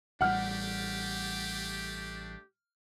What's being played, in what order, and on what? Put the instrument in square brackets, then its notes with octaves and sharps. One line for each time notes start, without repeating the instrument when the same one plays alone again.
[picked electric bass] A1 G3 [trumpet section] A3 D4 G4 [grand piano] F#5 F6